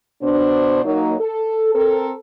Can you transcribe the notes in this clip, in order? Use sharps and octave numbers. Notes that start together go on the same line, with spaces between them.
B2 D4 C5
F#3 A#3 D#4
A4
C4 A4 A#4